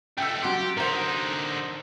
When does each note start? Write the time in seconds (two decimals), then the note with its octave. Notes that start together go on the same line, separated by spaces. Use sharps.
0.18 C#2 A3 G5 E6
0.42 F#3 G4 F#5 C6
0.77 D3 D#4 A#4 C5